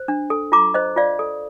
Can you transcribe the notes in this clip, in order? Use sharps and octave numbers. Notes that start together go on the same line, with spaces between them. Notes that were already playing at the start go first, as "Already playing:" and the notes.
Already playing: C5
D4
A4
F4 A#5 D6
C5 D#5
F4 D5 F5
A4